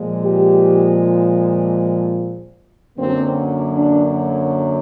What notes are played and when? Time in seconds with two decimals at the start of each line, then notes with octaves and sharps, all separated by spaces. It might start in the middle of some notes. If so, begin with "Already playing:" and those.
Already playing: A#2 F3 G#3
0.23 G4
2.97 F#2 D3 F#3 A#3 C4
3.75 D4